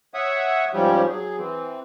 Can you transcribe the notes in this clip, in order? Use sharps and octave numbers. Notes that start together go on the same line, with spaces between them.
C#5 E5 F#5 D#6
G#2 F3 G3 C#4 G4
F#3 G#4
E3 C4